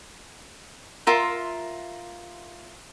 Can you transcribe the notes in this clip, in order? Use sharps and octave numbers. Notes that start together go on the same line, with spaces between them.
F4 A#4 E5 C6